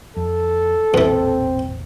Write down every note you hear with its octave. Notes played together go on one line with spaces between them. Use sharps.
F2 A4
E1 A1 E2 A#2 E3 C4